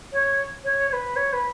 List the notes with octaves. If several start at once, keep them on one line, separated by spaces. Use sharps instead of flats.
C#5
C#5
C#5
B4
C#5
B4